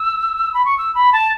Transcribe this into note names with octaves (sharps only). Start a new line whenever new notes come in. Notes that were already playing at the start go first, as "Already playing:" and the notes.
Already playing: E6
B5
C#6
E6
B5
A5